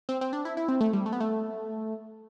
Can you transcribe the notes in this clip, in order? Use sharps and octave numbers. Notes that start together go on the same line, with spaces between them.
C4
C4
D4
E4
E4
C4
A3
G3
A3
B3
A3